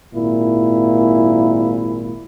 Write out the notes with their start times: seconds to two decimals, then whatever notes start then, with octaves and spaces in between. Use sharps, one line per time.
0.14 G#1 A#2 E4